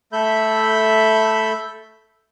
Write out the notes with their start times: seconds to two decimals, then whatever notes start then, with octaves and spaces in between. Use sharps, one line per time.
0.13 A3 A4 E5 B5 G6